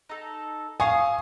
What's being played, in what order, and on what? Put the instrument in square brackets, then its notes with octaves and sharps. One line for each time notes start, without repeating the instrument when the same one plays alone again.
[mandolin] D#4 A4
[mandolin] F5 C#6 D#6 [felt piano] G#5